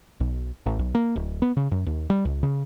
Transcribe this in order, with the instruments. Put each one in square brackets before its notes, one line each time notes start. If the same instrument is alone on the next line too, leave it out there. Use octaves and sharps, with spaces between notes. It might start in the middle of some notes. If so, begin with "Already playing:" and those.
[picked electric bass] B1
A1
B1
A#3
D1
B3
C#3
F#2
D#2
G3
C#2
C#3